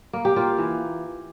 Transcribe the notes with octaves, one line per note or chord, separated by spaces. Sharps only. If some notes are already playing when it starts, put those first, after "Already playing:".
A#3
G4
A#3 F4
E3